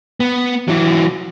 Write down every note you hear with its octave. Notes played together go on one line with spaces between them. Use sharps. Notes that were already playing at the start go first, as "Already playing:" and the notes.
B3
E3 F#3